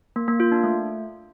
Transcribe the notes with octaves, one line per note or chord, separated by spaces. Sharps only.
A#3
A#3
F4
D4
A3